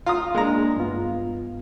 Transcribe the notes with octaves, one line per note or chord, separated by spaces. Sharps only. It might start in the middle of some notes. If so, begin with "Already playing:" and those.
F4 A#5 D#6
G#3 A#3 D4 A#5
G2 B3 F4